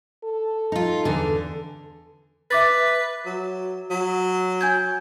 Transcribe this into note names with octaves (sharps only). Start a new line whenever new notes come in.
A4
D#4 F4
E2 D3
B4 E5 D6 A6
F#3
F#3
G#5 G6 G#6